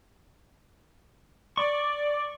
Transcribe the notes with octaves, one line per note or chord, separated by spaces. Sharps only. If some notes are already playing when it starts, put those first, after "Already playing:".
D5 C#6